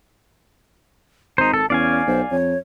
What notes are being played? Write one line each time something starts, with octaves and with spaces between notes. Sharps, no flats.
G#1 D#4 C5 A#5
A4 A5
E2 C#4 D5 F5 G#5
B1 C5
F2 C#5